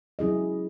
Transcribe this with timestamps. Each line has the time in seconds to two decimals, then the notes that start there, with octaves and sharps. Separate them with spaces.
0.19 F#3 C#4 E4 G#4 D#5